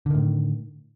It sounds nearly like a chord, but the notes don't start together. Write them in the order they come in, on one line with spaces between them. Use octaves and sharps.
D3 D#3 A2